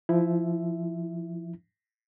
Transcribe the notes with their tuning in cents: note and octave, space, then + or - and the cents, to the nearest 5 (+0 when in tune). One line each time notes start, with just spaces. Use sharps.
F3 -20 E4 +0 E5 +0